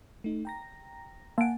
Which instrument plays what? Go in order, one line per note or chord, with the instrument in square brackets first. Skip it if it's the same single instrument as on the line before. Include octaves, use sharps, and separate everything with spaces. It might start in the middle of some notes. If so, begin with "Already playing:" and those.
[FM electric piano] A3 D#4
G5 A#5 A#6
[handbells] A#3 D7 [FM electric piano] F#5 G#5 A5